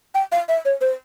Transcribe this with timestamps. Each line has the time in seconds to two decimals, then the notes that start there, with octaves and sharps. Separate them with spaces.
0.15 G5
0.32 F5
0.49 E5
0.65 C#5
0.81 C5